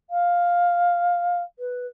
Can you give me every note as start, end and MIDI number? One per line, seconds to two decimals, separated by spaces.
0.10 1.42 77
1.59 1.86 71